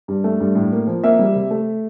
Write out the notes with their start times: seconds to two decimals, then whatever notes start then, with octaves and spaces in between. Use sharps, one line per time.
0.08 G2
0.24 A3
0.40 G2
0.55 A2
0.72 A#3
0.88 F3
1.04 A#3 E5
1.19 G3
1.35 C3
1.51 A3